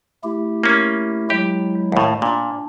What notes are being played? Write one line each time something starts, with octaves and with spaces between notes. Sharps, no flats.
A3 E4 G4
A#3 C#4
F#3 G#3 E4 G4
D#2 A2
A#2 D4